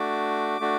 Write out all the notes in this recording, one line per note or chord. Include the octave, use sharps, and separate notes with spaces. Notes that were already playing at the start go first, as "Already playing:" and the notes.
Already playing: A3 D4 F#4 D6
A3 D4 F#4